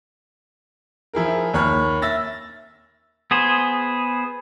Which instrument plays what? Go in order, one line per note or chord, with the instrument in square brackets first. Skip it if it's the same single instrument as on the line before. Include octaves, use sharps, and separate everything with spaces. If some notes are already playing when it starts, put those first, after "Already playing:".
[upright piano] F3 E4 G#4 A#4
D#2 C#5 B5 F6
E5 E6 A6 A#6
[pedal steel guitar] B3 G#4 C5